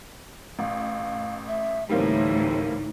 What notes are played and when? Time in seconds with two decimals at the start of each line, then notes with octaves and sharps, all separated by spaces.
0.59 A1 F5
1.48 E5
1.89 D2 A2 E3 G3 A#3 C4 D#4